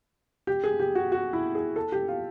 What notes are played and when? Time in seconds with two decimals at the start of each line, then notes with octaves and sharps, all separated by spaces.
0.47 G4
0.64 G#4
0.80 G4
0.95 F#4
1.12 F#4
1.33 E4
1.55 G#4
1.76 A4
1.92 G4
2.08 F4